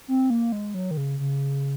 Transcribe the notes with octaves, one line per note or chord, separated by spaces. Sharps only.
C4
A#3
G#3
F#3
D#3
C#3
C#3